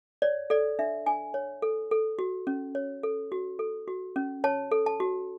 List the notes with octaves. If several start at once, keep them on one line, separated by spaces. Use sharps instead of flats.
C#5 D5
A4 D5
D4 E5
D4 G#5
C#5
A4
A4
F#4
C#4
C#5
A4
F#4
A4
F#4
C#4
C#5 A5
A4
A5
F#4